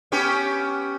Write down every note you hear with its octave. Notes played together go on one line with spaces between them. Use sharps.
B3 C#4 G4